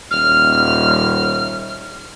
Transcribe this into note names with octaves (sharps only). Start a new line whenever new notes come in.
D#1 F6